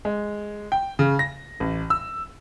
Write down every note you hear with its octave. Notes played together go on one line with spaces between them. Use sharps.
G#3
G5
C#3
A#6
A1
E6